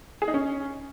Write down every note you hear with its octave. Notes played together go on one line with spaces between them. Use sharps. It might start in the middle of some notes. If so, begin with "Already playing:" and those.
G#4
D#4
C#4